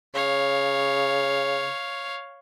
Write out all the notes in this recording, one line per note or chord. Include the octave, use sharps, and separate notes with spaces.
C#3 C#5 F5